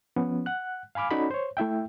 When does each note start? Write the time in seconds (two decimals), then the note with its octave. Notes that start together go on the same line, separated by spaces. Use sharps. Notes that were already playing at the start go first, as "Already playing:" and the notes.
0.16 F3 B3 C#4
0.46 F#5 F#6
0.95 F5 G#5 B5 D6 F6
1.11 C#4 D#4 F#4 A4 D5 B5
1.31 C5 C#5
1.57 A3 E4 E5 G5